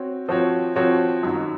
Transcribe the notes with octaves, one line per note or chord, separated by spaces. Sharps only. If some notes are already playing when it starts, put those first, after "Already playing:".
Already playing: C4 F#4 C#5
F3 C4 F#4 C#5
F3 C4 F#4 C#5
F#2 D#3 F#3